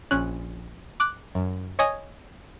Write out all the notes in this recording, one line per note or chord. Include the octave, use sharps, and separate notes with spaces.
A#1 C#4 F#6
D6 F#6
F#2
C#5 D#5 G#5 D#6